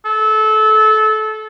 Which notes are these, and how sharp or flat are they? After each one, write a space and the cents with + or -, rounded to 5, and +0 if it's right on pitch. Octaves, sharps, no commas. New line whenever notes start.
A4 -25